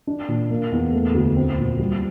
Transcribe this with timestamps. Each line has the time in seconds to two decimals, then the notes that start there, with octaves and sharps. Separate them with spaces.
0.07 D4
0.28 A#2
0.50 A#3
0.72 E2
0.93 A3
1.14 D2
1.36 C4
1.58 A#2
1.79 G3